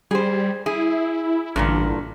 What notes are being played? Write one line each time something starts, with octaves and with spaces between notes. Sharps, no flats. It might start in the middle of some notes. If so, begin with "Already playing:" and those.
G3 G#4 C5
E4 G#4
A1 G2 A#2 D3